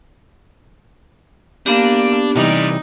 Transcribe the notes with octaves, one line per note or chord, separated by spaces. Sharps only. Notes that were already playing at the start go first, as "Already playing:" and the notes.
A#3 B3 D4 G4
C3 E3 G3 D#4 A#4 D5